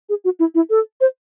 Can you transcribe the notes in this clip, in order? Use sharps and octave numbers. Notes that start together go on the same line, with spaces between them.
G#4
F#4
E4
E4
A4
C5